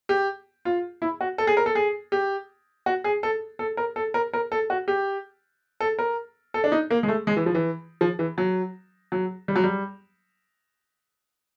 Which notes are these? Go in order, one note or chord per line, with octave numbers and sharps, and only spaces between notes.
G4
F4
E4
F#4
A4
G#4
A#4
A4
G#4
G4
F#4
G#4
A4
A4
A#4
A4
A#4
A#4
A4
F#4
G4
A4
A#4
A4
D4
D#4
A#3
G#3
A3
G#3
E3
F3
E3
F3
E3
F#3
F#3
G3
F#3
G3